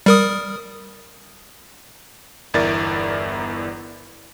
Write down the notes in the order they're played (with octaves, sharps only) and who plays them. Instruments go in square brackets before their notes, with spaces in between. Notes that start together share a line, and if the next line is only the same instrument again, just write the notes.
[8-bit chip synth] G3 A#4 D#6
[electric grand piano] G1 E2 E4 A#4 D5 A6